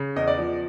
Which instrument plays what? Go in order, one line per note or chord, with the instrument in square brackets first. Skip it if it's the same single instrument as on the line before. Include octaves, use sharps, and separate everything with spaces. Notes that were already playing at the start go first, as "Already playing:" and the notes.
Already playing: [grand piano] C#3
E2 D#5
D5
F3